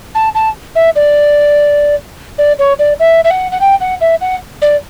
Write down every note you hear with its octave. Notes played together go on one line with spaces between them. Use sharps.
A5
A5
E5
D5
D5
C#5
D5
E5
E5
F#5
F#5
G5
F#5
E5
F#5
D5